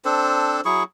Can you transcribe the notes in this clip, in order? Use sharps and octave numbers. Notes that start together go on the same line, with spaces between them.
C4 D4 A4 C5
F#3 E4 G#4 C#6